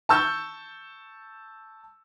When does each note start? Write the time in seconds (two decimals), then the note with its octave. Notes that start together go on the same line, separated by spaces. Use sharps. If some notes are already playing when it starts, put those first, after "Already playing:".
0.09 A5 C#6 E6 G6